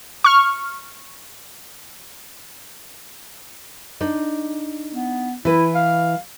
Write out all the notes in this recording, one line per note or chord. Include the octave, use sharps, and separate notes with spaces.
C#6 F6
D4 D#4
B3
E3 E4 B4
F5